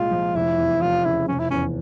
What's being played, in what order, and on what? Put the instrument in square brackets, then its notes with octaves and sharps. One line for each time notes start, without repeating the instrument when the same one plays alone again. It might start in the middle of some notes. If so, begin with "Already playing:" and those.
Already playing: [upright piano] C2 A#2 G#3 [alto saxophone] F4
[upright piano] F3
[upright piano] F1 [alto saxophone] E4
[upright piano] E2
[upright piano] F1 [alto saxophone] F4
[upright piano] C#3 [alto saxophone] E4
[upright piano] F1 [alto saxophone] C#4
[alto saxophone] E4
[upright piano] E2 [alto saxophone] C#4